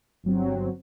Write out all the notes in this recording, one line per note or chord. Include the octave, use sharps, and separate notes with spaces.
G1 F#3 C4